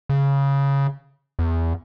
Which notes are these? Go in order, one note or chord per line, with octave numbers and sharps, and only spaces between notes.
C#3
E2